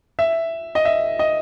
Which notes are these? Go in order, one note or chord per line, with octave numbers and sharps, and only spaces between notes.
E5
D#5
E5
D#5